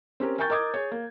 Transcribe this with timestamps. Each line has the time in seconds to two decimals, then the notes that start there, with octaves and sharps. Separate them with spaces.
0.20 C4 C#4 G4 A#4
0.38 A#4 G5 G#5 C#6 G6 A6
0.50 A#4 D#5 D6 D#6 G#6
0.74 G#4 C#5
0.92 A#3